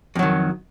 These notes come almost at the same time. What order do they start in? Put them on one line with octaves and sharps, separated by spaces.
F2 F#3 D#3